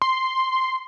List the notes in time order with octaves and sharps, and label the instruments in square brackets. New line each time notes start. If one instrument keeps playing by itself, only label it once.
[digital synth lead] C6